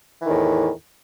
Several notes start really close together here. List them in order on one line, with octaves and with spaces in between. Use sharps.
E3 D#3 E2 A2